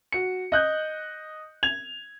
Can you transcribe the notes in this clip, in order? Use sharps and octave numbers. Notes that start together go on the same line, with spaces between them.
F#4 C#7
D#5 F#6 G6
G#6 F7